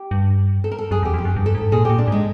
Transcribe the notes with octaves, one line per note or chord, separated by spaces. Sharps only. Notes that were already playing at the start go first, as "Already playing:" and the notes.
Already playing: G4
G2
A4
A#4
A4
F#2 G#4
E2 G4
F2 G4
F#2
G2
A4
G#2
A#2 G#4
A#2 G4
D4
G#2 G#3